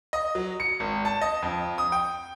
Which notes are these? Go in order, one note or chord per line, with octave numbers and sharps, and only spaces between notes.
D#5
F#3
C#7
G#1
A5
D#5
F2
D#6
G5